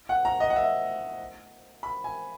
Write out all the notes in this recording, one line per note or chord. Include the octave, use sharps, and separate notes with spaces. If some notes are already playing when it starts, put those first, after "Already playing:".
F#5
A#5
D#5
F#5
E5
B5
G#5